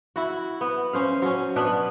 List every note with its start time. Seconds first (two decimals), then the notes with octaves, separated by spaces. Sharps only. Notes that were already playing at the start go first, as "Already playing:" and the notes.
0.16 E4 F#4
0.61 B3
0.93 C#4 C5 F5
1.22 F#3 C#4
1.56 B2 B3 D4 B4